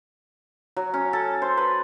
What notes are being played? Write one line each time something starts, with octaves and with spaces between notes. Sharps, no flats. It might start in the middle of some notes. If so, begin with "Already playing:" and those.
F#3
C#4
A4
C5
B4